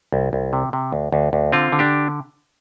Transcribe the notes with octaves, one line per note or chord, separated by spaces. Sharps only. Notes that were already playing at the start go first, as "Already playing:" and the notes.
C2
C2
C3
C3
D2
D2
D2
D3 C4 F4
D3
D4 G4